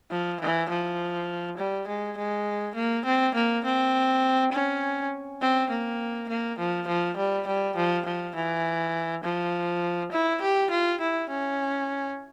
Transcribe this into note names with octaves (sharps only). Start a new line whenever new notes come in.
F3
E3
F3
G3
G#3
G#3
A#3
C4
A#3
C4
C#4
C4
A#3
A#3
F3
F3
G3
G3
F3
F3
E3
F3
E4
G4
F4
E4
C#4